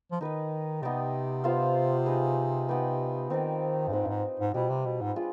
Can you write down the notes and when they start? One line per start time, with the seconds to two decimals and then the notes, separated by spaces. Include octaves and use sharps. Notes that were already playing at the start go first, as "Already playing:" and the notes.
0.12 F3
0.21 D#3 D#4 B4 D#5
0.82 C3 B3 D#4 G4 D5
1.44 B3 F4 C5 F5
2.06 D#4 G#4 B4
2.69 B3 D#4 G4 B4
3.30 D#3 C4 D#4 B4 D5
3.88 G2
3.93 G#2 C4 D#4 B4
4.04 G2
4.07 G#2
4.40 G#2
4.54 B2 G3 C4 F4 B4
4.70 C3
4.86 B2
5.01 G#2
5.16 D4 F4 G#4 B4